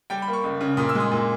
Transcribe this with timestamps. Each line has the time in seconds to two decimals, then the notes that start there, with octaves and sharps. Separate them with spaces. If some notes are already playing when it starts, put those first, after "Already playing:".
0.10 G3 G5
0.22 B5
0.28 A#3
0.33 C#6
0.44 C#2
0.61 C#3
0.77 A#2 D#6
0.89 E6
0.95 G#3
1.00 D#6
1.12 A#2